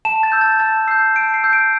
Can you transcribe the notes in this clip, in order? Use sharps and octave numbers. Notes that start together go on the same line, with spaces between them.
A5 E7
A6
E6 G6
A6
A5 A6
E6 G6 C7
A5 D7
C7
E6 G6
D7